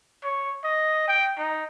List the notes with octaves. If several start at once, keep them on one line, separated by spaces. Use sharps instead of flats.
C#5
D#5
G5
D#4